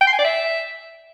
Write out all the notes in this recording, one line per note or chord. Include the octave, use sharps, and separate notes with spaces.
G5
C6
G#5
D5
E5